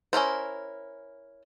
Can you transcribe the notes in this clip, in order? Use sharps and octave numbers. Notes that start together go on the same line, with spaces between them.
C#4 E4 A#4 C5